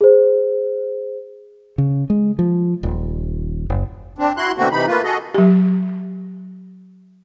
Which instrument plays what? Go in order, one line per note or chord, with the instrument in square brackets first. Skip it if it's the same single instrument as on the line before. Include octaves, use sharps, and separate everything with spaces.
[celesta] G#4 C5
[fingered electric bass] C#3
G#3
F3
D#1
F#1
[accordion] C4 D4
E4 F#4 C6 F#6
B2 D3 A3 A#3 C4 F#4
C3 E3 D#4 B5
A3 A#3 F4 B4
F#4 G#4 A4 D#5
[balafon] F#3 G4